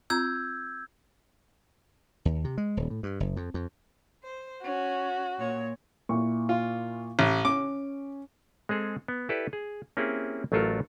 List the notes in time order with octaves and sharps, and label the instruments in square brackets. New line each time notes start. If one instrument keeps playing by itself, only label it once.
[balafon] C4 F4 A#5 [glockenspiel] E6 G6 G#6
[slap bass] D#2
C3
G#3
D#1
A2
G2
F#1
F2
F2
[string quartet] C5
[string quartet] C#4 [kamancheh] F#4
[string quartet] A#2 C#5
[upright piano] A#2 E4 C#6
[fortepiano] F4
A1
[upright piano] C#4 [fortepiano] D6
[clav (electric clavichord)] G#3 C4 G#4 A4
B3
E4 G4 A4 B4 D5
G#4
A#3 C4 C#4 E4 G4 G#4
A1 F#3 A3 F4 A4 A#4